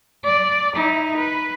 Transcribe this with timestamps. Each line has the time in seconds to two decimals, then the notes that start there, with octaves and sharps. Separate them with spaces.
0.24 D5
0.75 D#4 E4
1.17 B4